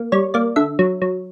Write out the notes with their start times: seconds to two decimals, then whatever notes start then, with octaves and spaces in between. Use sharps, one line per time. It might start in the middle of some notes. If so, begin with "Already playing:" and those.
Already playing: A#3
0.12 G3 C#5
0.34 A#3 D5
0.56 D3 E5
0.79 F#3
1.02 F#3